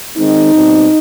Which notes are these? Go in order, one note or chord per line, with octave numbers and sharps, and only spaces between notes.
D#3 G#3 C4 D#4
B2 G3 C4